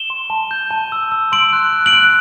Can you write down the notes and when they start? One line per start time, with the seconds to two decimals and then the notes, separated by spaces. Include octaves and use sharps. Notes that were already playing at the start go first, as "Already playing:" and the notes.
Already playing: E7 G7
0.10 C6
0.30 A5
0.51 G6
0.71 A5
0.92 E6
1.12 E6
1.32 C6 D7 F#7
1.53 F#6
1.73 F#6
1.86 D7 F#7
1.93 F#6